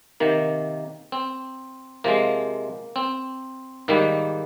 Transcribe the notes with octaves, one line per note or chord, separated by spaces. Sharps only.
C3 D#3 A#3
C4
C3 F3 G#3 A#3
C4
G#2 D#3 G3 A#3